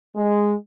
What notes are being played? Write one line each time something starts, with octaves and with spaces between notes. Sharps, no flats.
G#3